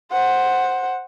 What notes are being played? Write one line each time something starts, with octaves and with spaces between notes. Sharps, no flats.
C5 F#5